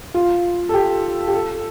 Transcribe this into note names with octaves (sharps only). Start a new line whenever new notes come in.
F4
A4
G4
G4
A4